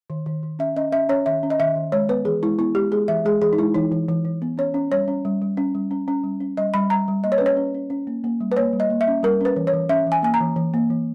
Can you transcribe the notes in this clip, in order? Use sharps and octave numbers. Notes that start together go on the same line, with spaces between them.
D#3
D#3
D#3
C#4 E5
C#4 D#5
C#4 E5
C#4 C#5
D#3 E5
C#4
D#5
D#3 E5
D#3
G#3 C#5
B3 B4
E3 G#4
G#3 E4
B3 E4
G#3 G4
G#3 G#4
E3 E5
G#3 G#4
E3 G#4
D#4
G#3 E4
E3 D#4
E3
E3
E3
B3
C#4 C#5
C#4
G3 C#5
C#4
G3
G3
C#4
G3
C#4
C#4
G3
C#4
G3 D#5
G3 B5
G3 A#5
G3
A#3 D#5
C#5
B4
C#4
C#5
C#4
C#4
C#4
A#3
A#3
G3
B4
A#3 C#5
G3
D#5
A#3
E5
C#4
G3 A#4
C#4 B4
E3
C#5
E3
C#4 E5
E3
G#5
A#3 G#5
A#5
E3
E3
A#3
E3